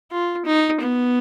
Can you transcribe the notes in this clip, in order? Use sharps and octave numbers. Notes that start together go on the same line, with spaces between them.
F4
D#4
B3